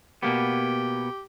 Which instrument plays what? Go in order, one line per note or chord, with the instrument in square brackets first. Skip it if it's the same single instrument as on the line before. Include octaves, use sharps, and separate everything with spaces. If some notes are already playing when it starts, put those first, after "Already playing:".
[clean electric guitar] B2 A#3 B3 [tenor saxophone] G4